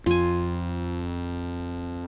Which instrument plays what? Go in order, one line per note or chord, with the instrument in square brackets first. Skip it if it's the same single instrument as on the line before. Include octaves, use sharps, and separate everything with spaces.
[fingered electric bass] F2 [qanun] F4 G#5